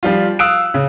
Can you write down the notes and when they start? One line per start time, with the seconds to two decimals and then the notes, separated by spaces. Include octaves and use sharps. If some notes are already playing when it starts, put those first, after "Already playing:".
0.03 F3 G3 F4
0.39 F5 D#6 E6 F#6 D7
0.74 C#3